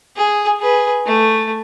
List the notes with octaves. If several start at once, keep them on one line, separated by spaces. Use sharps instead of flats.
G#4
G#4 B4
A3